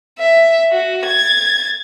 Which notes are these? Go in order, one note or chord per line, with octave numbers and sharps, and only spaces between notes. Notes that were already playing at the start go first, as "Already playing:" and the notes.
E5
F#4
G#6 A6